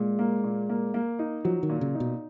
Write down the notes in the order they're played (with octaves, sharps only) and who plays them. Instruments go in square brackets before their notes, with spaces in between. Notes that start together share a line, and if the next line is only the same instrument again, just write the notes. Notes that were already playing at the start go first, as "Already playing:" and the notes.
Already playing: [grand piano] A#2 [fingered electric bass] G#3
[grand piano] A#3
A#2
A#3
A#3
D#4
[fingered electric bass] F3 [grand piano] F#3
[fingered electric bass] D#3
[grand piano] A#2
[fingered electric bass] C#3
[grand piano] D#4
[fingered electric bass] B2